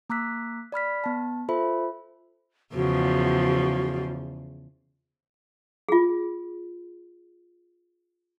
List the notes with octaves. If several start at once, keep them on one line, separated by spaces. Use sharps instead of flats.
A#3 A#5 D6 E6 F#6 B6
D5 B5 F6 B6
B3 A5
F4 A4 C5 E5 B5
E2 C#3 F3 F#4
F4 G#4